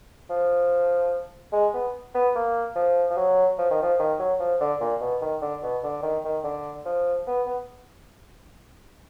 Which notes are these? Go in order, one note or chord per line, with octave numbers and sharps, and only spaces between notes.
F3
G#3
B3
B3
A#3
F3
F3
F#3
F3
D#3
F3
D#3
F#3
F3
D3
A#2
B2
D#3
D3
B2
D3
D#3
D#3
D3
F3
B3
B3